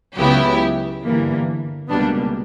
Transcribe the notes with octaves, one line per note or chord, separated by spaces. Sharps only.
C#2 C#3 F#3 B3 E4 G4
G1 G2 E3 A#3
C#2 B2 G3 A#3 B3 D4